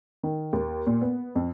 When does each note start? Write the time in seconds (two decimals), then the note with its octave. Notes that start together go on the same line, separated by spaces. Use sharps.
0.23 D#3
0.53 D#2
0.87 A#2
1.01 B3
1.35 F2